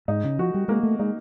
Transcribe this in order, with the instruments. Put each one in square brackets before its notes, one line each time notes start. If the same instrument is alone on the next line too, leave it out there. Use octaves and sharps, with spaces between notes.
[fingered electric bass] G#2 [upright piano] D#4
[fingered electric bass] C#3
[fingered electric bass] F3 [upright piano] F#4
[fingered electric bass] G3
[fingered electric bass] G#3 [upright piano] A#3
[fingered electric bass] A3
[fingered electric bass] G#3 [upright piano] D#4